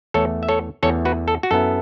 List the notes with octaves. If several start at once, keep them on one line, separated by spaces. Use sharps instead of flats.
E2 E3 A3 A4 C#5
E5
A4 C#5
E2 E3 A3 A4 C#5
F#4 B4
A4
F#4
F#2 F#3 B3 E4 A4